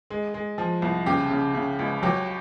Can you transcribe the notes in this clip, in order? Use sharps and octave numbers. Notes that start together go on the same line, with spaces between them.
G#3
G#3
F3
C2
C#3 G4
C#3
C#3
C#2
F#3 G4